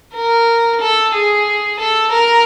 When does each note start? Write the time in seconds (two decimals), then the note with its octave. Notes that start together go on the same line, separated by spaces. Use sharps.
0.14 A#4
0.80 A4
1.14 G#4
1.79 A4
2.11 A#4